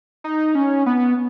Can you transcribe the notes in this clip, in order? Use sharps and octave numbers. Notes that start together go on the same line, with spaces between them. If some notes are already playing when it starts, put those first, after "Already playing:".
D#4
C#4
B3